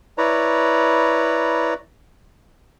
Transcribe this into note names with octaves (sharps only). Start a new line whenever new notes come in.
E4 B4 C#5 D5 A#5